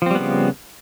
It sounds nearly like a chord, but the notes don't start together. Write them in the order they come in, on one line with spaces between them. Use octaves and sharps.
F3 C4 G3 B3 C#3